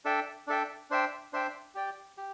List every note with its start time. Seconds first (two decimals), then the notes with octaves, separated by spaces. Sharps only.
0.05 D4 A4 E5 G5
0.47 D4 A4 E5 G5
0.90 D4 C5 E5 G5
1.33 D4 C5 E5 G5
1.75 G4 D5 G5
2.18 G4